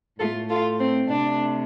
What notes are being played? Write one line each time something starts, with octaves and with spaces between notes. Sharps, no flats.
A2 A3 F4 A4
F4 A4
C4
C3 A3 D4